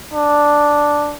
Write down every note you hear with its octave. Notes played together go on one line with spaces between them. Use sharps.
D4